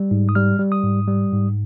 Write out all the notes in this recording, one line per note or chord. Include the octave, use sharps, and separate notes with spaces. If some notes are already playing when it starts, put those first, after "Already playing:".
Already playing: G3
G#2
D#6
G3 F6
G3
D#6
G#2
G3
G#2